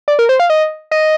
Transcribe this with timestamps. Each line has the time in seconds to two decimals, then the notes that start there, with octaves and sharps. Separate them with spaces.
0.08 D5
0.19 A#4
0.29 C5
0.40 F5
0.50 D#5
0.91 D#5